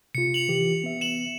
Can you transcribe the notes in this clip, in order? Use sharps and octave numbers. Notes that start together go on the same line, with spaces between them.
C3 F4 C#7
C#7 F7 F#7
E3 G4
B3 E5
E7 F#7